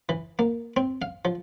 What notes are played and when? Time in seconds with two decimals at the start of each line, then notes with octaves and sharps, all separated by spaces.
0.09 E3
0.39 A#3
0.77 C4
1.02 F5
1.25 F3